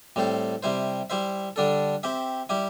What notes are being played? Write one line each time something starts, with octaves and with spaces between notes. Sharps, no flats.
A2 G3 C4 A4 C5
C3 G3 E4 C5
G3 E4 C5 E5
D3 G3 D4 A4
C4 G4 E5
G3 E4 G4